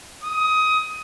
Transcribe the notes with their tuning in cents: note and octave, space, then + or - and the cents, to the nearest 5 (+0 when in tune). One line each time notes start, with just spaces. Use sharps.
D#6 +20